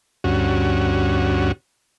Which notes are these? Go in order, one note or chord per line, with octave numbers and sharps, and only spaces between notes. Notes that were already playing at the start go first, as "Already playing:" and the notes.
D2 G2 C#4 F#4